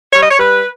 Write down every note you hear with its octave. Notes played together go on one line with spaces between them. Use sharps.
G3 C#5
D#5
C#5
G3 B4